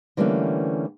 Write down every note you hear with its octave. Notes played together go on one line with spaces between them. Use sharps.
D3 E3 G3 A3 A#3 C#4